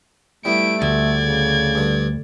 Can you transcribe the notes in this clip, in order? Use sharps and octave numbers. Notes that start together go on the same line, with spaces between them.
G3 A3 B3 E4 D7
D2 D5 G#6
C#3
G2 D3